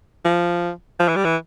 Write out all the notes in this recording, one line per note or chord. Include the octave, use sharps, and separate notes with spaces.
F3
F3
E3
G3
E3